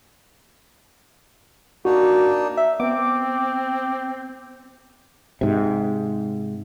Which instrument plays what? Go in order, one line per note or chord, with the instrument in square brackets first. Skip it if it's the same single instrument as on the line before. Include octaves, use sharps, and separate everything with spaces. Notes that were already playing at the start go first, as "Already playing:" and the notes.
[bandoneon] A#3 D4 D#4 [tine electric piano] F#4
[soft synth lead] E5
[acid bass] B3 [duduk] C4 [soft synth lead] D6
[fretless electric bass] G#2 C3